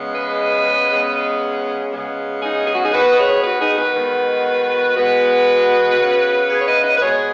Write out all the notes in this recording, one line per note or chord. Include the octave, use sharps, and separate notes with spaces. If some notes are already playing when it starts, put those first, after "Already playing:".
Already playing: C#3 G#3 B3
B4 D#5
C#3 G#3 B3
C#3 G#3 B3
D#4 G#4
G#4
F#4
D#4 G#4
D#3 B3 F#4 B4
D#5
G#4 C#5
F#4 B4
D#4 G#4
F#4 B4
D#3 G#3 B3
B2 G#3 B3 F#4 B4
C#3 B3
G#4 C#5
C#5
B4 D#5
B4 D#5
B4
B2 G#3 B3 G#4 C#5